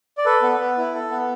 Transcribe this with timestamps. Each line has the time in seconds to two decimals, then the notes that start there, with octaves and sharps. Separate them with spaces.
0.18 D5
0.25 A4 B4
0.42 B3
0.59 B3
0.77 E4
0.95 A4
1.11 B3